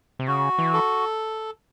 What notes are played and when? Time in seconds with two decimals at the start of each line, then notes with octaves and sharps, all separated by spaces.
0.19 C3
0.27 C#3 F#4
0.58 E3
0.73 A4